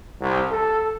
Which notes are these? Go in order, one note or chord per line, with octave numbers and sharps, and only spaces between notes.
C2
A4